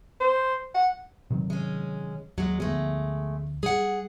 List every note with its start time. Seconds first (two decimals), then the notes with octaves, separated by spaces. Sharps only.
0.20 C5
0.75 F#5
1.30 C3 D#3 F#3
1.50 G#3 C#4
2.38 D#2 F#3 G#3
2.60 D2 F3 G#3 A3 B3
3.63 G3 G#4 F#5